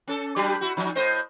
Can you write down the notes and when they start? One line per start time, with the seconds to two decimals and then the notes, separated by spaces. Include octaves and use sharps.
0.08 C#4 A4
0.36 F#3 G3 D4
0.61 E4 F#4
0.77 F3 D#4
0.95 A2 C5 D#5